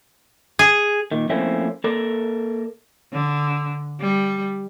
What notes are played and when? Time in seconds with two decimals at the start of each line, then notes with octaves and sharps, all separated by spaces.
0.59 G#4
1.11 A#2 D#3
1.30 F3 A3 A#3 C4 C#4 E4
1.84 A#3 A4 A#4 D5
3.13 D3
4.01 G3